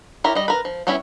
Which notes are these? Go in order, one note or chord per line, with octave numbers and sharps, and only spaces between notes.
E4 G4 A#4 C#5
G3 D#5
A#4 B4
F3
G3 B3 C#4 E4 E5